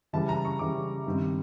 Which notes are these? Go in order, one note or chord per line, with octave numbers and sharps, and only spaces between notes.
C#3 E3 G3 A5
A#5
C#6
C#3 E3 G3 D6
G2 D#3 G3 C4